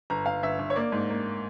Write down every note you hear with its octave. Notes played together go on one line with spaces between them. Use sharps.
G1 A#5
G1 F5
G1 E5
G1
C#5
A#3 D5
G#2
A#3